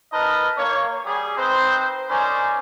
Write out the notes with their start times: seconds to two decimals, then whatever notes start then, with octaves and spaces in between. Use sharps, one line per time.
0.13 D#4 A#4 B4 D#5 A5
0.57 A#3 C#5
1.06 G3 G#4
1.37 C4 D#4 B4 C5
2.09 C#4 D#4 A#4 C5 D5 G#5